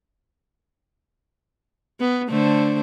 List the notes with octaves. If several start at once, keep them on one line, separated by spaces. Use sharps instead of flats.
B3
D3 A3 C5